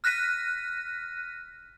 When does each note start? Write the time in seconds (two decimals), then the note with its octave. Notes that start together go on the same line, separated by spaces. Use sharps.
0.04 F6 F#6 A#6 B6 D#7